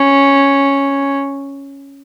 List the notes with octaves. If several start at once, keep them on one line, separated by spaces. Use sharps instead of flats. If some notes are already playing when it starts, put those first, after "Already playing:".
Already playing: C#4